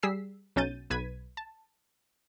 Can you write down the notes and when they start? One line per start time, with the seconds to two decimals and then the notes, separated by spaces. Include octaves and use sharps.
0.03 G3 G#4 E6 B6 C7
0.56 B1 F#3 C#4 G6 A6 D#7
0.90 B1 B4 G#6 B6 D#7
1.37 A5